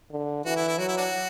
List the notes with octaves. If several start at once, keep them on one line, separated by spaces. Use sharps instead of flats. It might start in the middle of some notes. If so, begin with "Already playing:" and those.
D3
E3 F#4
E4
E4
F#3 F#4
E4
D4 F#4